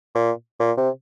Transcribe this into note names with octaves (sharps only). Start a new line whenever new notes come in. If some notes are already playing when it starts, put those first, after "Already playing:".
A#2
A#2
C3